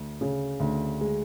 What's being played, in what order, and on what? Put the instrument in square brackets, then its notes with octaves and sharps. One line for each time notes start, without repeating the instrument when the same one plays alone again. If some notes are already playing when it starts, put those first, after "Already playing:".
Already playing: [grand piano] D2
C#3
D2
G#3